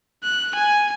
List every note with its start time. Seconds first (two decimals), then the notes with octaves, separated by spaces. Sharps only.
0.24 F#6
0.55 G#5